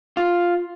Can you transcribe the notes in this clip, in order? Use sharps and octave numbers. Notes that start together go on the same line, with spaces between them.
F4